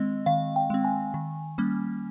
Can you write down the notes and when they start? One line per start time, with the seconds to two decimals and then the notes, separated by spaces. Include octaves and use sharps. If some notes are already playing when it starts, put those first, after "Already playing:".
Already playing: D#3 G#3 C4 D#5
0.26 D#3 F5
0.56 G5
0.70 G#3 C4
0.85 G#5
1.14 D#3
1.58 G3 A#3 C#4